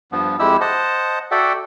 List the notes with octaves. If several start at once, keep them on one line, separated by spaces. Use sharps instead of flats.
G2 F3 B3
F2 G#3 E4 G4 E6
C5 D#5 F#5 A5
F#4 A4 D5 E5 F#5 G5